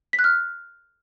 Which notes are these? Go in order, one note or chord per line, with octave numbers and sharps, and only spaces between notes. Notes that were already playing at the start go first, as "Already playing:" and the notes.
B6
F#6
F6